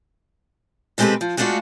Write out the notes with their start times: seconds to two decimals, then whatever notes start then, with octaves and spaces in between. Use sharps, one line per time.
0.98 B2 G#3 C4 G4 A4 B4
1.21 F3
1.37 G#3 A3 B3 D4 F4 F#4